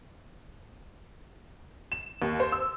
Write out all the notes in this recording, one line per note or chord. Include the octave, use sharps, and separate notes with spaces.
E7
D#2
C5
E6